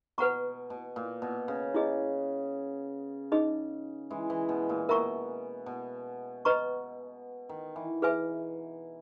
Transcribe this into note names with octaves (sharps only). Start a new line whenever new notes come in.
B2 B4 F#5 A#5 C#6
B2
A#2
B2
C#3
E4 G#4 D#5
D#4 G#4 D#5
E3 G#3
E3
B2
A#2
B2 A#4 E5 A#5 C#6
B2
B4 D#5 A#5 C#6
D#3
E3
G#4 B4 E5 G#5